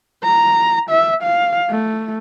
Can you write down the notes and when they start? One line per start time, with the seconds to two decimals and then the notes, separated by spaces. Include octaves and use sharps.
0.24 A#5
0.90 E5
1.23 F5
1.70 A3